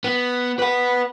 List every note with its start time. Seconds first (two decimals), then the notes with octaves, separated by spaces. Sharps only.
0.04 B3
0.59 B4 F#5